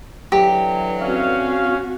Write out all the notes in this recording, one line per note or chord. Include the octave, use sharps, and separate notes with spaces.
D3 E3 F#3 G4
C4 C#4 F#4 F5